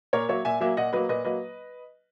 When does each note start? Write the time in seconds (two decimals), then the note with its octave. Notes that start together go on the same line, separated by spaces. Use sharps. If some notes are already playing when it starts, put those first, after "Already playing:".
0.13 A#2 A#4 C#5
0.29 F#3 A#3 C#5 E5
0.45 A#2 E5 G#5
0.61 F#3 A#3 E5 G#5
0.77 A#2 D#5 F#5
0.93 F#3 A#3 B4 D#5
1.09 A#2 B4 D#5
1.25 F#3 A#3 B4 D#5